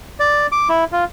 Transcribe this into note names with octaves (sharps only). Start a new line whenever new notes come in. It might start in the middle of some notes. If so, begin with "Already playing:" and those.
D5
D6
E4
F4